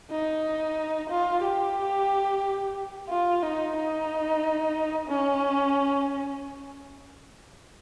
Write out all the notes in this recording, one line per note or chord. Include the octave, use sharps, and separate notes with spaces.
D#4
F4
G4
F4
D#4
D#4
C#4